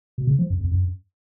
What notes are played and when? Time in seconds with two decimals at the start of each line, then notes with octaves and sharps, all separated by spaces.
0.18 B2
0.27 C#3
0.39 F3
0.50 F#2
0.61 F2
0.71 F#2